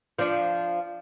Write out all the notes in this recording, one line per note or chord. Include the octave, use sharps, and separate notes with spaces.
F3 D4